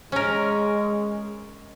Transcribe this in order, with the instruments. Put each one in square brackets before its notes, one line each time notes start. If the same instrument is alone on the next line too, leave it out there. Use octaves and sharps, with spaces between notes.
[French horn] G#3 [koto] C#4 A#4